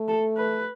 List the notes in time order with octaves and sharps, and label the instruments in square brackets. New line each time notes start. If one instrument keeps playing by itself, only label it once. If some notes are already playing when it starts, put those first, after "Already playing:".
Already playing: [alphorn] A3
[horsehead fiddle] A4
B4